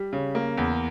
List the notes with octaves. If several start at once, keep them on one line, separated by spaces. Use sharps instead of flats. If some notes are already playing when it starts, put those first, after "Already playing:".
Already playing: G3
C#3
A#3
E2